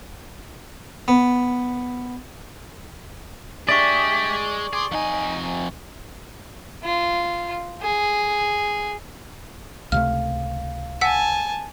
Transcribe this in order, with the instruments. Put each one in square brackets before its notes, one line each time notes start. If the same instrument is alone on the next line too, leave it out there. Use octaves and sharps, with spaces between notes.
[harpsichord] B3
[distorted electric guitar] G#3 G#4 [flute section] D4 G4 E5 [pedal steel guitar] D5 [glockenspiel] C#6 F#7
[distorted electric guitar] G#4 [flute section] G#5 C6 D6
[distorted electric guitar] F2 G#5 [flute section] D#4
[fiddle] F4
G#4
[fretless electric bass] C#2 C3 A3 [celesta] F5 [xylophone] F6
[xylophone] F#5 E6 B6 [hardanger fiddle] G#5 A5